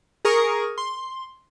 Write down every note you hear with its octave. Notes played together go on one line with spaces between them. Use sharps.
G#4 A#4 C#6 D#6
C6